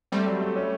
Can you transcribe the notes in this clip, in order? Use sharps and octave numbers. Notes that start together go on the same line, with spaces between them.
G3 A3 C4
F#3
A3
C#4